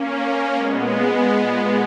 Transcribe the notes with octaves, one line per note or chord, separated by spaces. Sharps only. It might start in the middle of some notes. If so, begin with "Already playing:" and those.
Already playing: A#3 C#4
A#2 G#3 B3
A#2